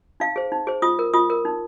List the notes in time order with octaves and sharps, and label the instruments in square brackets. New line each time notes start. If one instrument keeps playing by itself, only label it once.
[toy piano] D#4 F5
G#4 C5
D#4
G#4 C5
F4 D#6
A#4
F4 D#6
A#4
D#4